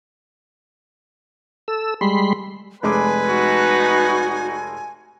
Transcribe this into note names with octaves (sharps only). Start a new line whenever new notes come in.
A4 E6
G3 G#3 B5 C6
F1 G#3 B4 G#5 D6
D#4 F#4